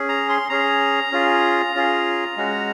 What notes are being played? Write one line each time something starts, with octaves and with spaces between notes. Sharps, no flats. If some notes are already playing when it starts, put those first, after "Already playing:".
Already playing: C#4 G#4
A#5
C6
C#4 G#4 A#5
C#4 F4 G#4
C#4 F4 G#4
G#3 C#4 F#4